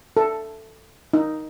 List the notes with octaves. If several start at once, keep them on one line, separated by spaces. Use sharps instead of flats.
A4
D#4